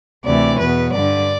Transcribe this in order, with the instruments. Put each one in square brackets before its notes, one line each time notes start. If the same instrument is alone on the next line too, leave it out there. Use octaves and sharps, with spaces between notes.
[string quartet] D2 C3 E3 D5
E2 B2 B4
G2 D3 D5